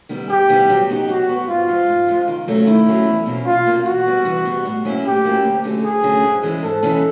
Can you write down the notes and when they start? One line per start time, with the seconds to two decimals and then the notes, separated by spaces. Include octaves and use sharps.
0.09 D#3 G3 B3 E4
0.29 G2 G4
0.49 D#3 G3 B3 E4
0.70 F#3
0.89 B3 D#4 G4
1.09 F#3 F#4
1.28 B3 D#4 G4
1.48 G#2 F4
1.68 F3 G#3
1.88 G#2
2.08 F3 G#3
2.28 D#3
2.48 F#3 A3 C#4 F4
2.67 D#3 E4
2.87 F#3 A3 C#4 F4
3.07 E2
3.26 B2 F#3 A#3 C#4
3.46 E2 F4
3.66 B2 F#3 A#3 C#4
3.86 E3 F#4
4.05 G3 B3
4.25 E3
4.45 G3 B3
4.65 A2
4.85 F#3 A#3 C#4 E4
5.04 A2 G4
5.25 F#3 A#3 C#4 E4
5.44 D2
5.64 D3 F#3 A3 C#4
5.84 D2 G#4
6.03 D3 F#3 A3 C#4
6.23 G#2
6.43 E3 G#3 C#4 E4
6.63 G#2 A4
6.83 E3 G#3 C#4 E4